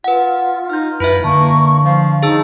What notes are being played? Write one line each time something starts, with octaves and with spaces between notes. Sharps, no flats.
F4 B4 F#5
D#4 F6 G6
F#2 E4 B4 E5
D3 A#3 A5 C#6
F3 F5
D4 D#4 G#4 A5 E6